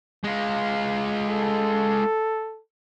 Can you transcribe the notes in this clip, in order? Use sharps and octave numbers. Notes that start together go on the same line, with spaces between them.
G#3 F4
A4